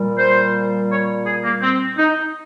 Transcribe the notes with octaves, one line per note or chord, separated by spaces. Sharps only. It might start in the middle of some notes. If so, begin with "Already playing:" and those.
Already playing: A#2 G3
C5
C#5
G#4
A#3
C4
D#4